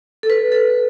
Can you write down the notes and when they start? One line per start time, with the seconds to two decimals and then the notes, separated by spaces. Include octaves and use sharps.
0.23 A4
0.30 B4
0.52 A4